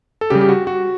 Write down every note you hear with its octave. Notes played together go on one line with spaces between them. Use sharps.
A4
C#3 G3 G4
G4
F#4
F#4